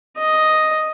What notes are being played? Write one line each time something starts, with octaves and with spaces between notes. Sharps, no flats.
D#5